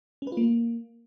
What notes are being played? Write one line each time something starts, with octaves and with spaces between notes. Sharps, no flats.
C#4
B4
F4
A#3